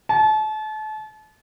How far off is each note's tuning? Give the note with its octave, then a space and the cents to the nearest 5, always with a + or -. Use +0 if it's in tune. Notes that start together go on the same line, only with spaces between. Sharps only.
A5 -35